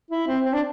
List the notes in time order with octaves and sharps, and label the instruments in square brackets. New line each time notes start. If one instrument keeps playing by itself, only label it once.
[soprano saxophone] E4
C4
C4
D4